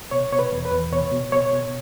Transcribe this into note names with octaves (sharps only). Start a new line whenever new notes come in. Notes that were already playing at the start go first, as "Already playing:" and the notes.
B2 C#5
B2 C#5
B4
E2
B4
E2
B2 C#5
B2
B2 C#5
B2